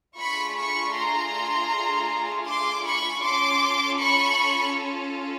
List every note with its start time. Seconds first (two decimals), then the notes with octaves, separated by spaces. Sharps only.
0.17 A3 D4 F4 G#4 B5 C#6
0.56 B5 C#6
0.94 A#5 C6
2.47 C6 D6
2.85 B5 C#6
3.23 C#4 F4 A4 C6 D6
4.00 B5 C#6